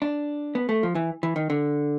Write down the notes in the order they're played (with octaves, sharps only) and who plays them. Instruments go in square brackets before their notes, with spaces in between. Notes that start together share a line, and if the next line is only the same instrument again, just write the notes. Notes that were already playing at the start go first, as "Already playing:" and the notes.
[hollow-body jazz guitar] D4
B3
A3
F3
E3
E3
D#3
D3